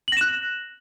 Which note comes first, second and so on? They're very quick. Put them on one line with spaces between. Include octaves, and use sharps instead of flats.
F#7 A#6 E7 F#6